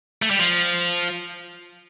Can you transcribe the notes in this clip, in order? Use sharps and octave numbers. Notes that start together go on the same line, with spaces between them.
A3
G3
F3